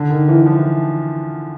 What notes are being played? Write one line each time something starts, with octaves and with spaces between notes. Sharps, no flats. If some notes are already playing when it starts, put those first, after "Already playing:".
Already playing: D3
D#3
E3
E3
F3